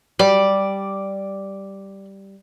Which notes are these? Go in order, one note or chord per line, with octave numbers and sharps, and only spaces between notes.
G3 D5